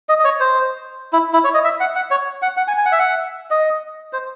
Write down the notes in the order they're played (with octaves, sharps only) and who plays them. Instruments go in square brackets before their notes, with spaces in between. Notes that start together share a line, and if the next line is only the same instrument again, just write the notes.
[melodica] D#5
D#5
C#5
C5
E4
E4
C#5
D#5
E5
F#5
F#5
C#5
F#5
F#5
G#5
G#5
F#5
E5
F#5
D#5
C5